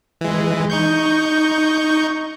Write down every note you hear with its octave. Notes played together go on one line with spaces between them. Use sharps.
E3 G#3
D#4 C#6 G6